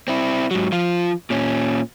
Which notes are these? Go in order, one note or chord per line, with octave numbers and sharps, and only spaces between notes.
C4 E4
G#2 F#3
F3 F4
A#2 C#4